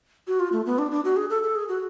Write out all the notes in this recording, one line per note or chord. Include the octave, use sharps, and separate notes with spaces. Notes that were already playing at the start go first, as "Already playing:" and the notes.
F#4
F4
A3
B3
D4
D4
F#4
G#4
A4
A4
G#4
F#4